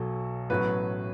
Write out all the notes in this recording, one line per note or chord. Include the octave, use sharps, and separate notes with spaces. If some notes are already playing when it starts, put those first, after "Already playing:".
Already playing: B1 B2 F#3 A4
A1 A2 F#3 B3 B4